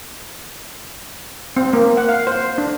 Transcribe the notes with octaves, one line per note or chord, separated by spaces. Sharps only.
C4
A#3
F#5
F5
C5
D4